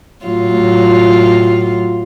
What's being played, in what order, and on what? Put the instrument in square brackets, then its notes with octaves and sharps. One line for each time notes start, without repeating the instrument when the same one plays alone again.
[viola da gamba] A2 F#3 F4